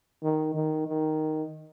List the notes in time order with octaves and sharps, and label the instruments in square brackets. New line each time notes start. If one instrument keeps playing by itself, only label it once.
[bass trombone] D#3
D#3
D#3